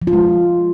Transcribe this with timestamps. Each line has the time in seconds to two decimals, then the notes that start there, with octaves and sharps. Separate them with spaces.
0.02 F3
0.07 F4
0.13 G#3